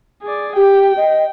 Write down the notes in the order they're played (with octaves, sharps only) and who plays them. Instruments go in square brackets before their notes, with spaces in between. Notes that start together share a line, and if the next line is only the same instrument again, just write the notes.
[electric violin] G#4 D5
[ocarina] G4 [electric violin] G5
[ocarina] D#5